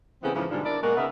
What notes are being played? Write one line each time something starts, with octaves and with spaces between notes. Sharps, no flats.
C#3 E3 A3 B3 C4
G#2 C#3 E3 F3
G#2 B2 D3 G3 D4 F4
D4 E4 A#4 D5
B2 G#3 A#3 F#4 A#4
C#3 B3 D#4 A#4 E5